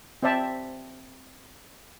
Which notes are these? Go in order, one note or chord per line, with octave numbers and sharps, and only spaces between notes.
C4 C5 D5 E5 A5